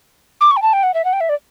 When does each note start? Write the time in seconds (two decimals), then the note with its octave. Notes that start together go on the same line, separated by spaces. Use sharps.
0.41 D6
0.51 C#6
0.57 G5
0.62 A5
0.73 G5
0.83 F#5
0.94 E5
1.05 F#5
1.13 G5
1.21 E5
1.29 D5